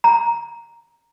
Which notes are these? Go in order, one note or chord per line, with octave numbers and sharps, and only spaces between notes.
A#5